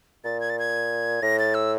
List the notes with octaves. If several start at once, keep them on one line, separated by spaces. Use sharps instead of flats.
A#2 A6
G#6
A6
G#6
A2 A#6
A6
E6